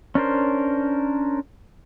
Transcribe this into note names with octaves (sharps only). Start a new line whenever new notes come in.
C#4 D4 A#4 C5